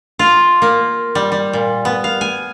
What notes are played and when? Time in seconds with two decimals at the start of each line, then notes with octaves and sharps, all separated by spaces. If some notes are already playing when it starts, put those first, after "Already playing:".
0.19 F4
0.62 A#3
1.15 G3
1.32 G3
1.53 A#2
1.85 B3
2.04 F5
2.21 G#5